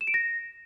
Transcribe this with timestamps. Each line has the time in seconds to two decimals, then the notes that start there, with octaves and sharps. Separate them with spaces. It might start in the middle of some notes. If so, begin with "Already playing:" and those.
0.01 E7
0.07 D7
0.14 A#6